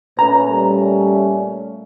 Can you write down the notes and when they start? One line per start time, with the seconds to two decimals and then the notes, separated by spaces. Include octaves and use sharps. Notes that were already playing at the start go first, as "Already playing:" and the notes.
0.19 A#2 A3 C#4 B4 A#5
0.49 G3